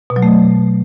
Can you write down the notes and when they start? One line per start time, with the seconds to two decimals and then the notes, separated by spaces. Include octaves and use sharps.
0.10 B2
0.16 F#3
0.22 A3